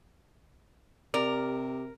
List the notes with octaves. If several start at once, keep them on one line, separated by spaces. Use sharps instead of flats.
C3 G4 A#4 D5